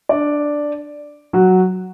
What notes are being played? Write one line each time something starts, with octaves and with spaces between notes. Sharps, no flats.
D4 D5
F#3 F#4